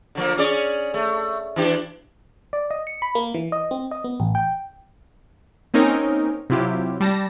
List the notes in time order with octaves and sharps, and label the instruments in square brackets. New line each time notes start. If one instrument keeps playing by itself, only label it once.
[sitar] D3 F3 A#3
C#4 G#4 D5
A3
E3 D4 G4
[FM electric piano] D5
D#5
C#7
B5
A#3
E3
D#5
C4
D#5
B3
A1
G5
[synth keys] A#3 C4 C#4 D#4 A#4
C3 F#3 E4 F4 G4
G3 A5 A#6